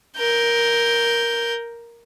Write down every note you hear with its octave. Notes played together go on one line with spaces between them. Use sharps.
A#4 G6